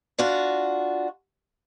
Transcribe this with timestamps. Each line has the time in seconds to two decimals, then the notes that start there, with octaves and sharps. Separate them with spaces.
0.18 D4 F4 F#4